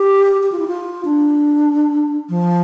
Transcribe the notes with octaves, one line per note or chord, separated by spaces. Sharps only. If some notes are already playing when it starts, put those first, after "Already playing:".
Already playing: G4
G4
F4
E4
F4
D4
F3